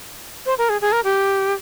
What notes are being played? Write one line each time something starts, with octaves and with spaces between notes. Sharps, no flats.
C5
A#4
G#4
G#4
A#4
G4